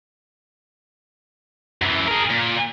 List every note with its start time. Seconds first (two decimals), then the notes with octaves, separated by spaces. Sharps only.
1.82 F#2 E3
2.08 G#4 A#4
2.30 A#2